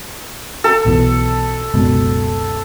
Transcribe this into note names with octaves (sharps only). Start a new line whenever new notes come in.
A4
B1 B2 E3
F#1 C#2 B2